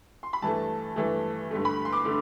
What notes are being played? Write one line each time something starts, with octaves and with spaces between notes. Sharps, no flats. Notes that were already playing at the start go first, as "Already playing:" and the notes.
C6
B5
G2 E3 A3 A5
G2 E3 A3
G2 D3 A3
B5
C6
D6
D3 A3